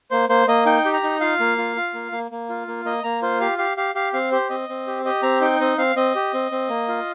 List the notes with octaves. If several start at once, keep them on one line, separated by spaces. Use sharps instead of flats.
A#3 C5
A#3 C5
A#3 D#5
D#4 G5
G4
A#5
D#4
F4 F5
A#3
F4
F4
A#3
A#3
A#3
F4
A#3
A#3 D#5
A#3 A#5
F4 C5
G4 F5
G4 F5
G4 F5
G4 F5
C4 F5
G4 C5
C4 D#5
C4
G4
G4 D#5
C4 A#5
D#4 G5
C4 D#5
C4 F5
C4 D#5
G4
C4
C4
A#3
F4